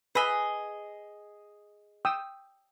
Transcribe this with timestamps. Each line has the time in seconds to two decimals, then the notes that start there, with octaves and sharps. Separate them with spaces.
0.15 G#4 B4 D#5 B5 E6
2.05 G5 D#6 E6